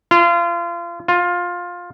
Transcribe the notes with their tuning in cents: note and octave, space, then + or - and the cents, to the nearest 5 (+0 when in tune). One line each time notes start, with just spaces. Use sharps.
F4 -30
F4 +15